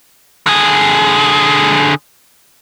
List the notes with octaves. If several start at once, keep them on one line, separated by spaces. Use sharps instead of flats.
D3 G#4